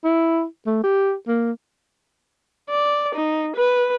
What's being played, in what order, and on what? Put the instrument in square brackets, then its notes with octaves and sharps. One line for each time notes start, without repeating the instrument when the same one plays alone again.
[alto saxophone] E4
A3
G4
A#3
[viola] D5
D#4
B4